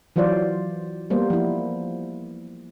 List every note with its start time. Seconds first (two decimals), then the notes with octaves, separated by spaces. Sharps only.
0.16 E3 F#3 F4 C5 D5
1.10 G3 A#3 B3 C5
1.30 F3 E4